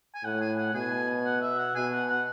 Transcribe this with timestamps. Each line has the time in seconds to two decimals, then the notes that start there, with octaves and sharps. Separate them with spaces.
0.15 G#5
0.24 A2 F#5
0.41 G#5
0.58 F#5
0.74 B2 G#5
1.25 F#5
1.42 E5
1.58 F#5
1.75 B2 G#5
1.93 F#5
2.10 F#5